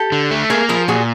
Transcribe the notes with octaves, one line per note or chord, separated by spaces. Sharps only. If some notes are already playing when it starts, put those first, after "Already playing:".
Already playing: G4 A4
D3
A3
A#3 G#4 A#4
F3 G#4 A#4
A#2 F#4 G#4